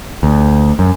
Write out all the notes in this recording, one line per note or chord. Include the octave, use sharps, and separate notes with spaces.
D2
F#2